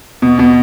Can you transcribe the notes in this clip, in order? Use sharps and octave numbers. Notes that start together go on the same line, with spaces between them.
B2
B2